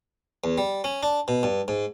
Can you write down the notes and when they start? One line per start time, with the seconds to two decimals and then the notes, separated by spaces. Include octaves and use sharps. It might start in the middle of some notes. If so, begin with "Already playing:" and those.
0.44 E2
0.58 G3
0.84 C#4
1.03 D4
1.28 B2
1.43 G2
1.68 G#2